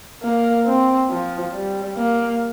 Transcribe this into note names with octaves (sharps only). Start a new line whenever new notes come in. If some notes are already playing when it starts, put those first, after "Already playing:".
A#3
C4
F3
G3
A#3